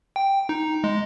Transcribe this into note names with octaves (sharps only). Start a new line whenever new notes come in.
G5
D#4
G#3